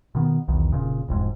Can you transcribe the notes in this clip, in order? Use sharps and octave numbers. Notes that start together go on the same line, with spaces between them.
B2 D#3 B3
B1 E2 D#3
F1 A#2 C#3
E1 F2 G#2 G#3